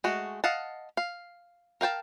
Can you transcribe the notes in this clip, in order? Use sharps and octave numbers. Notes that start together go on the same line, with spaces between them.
G#3 A3 F#4
D#5 F5 F#5 A5
F5
A#4 F5 G5 A5